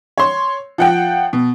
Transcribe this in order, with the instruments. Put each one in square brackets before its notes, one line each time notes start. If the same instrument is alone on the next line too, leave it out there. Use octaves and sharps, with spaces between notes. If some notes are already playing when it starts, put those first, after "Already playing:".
[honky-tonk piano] C#5 C6
F3 F#5 G5
B2